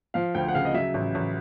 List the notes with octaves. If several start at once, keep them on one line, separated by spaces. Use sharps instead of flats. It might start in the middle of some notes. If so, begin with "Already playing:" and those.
F3 F5
D2 G5
F#5
C#3 F5
D#5
F#3 E5
A1
A1